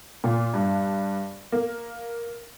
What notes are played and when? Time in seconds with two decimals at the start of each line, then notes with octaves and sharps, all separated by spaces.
0.24 A#2
0.54 G2
1.52 A#3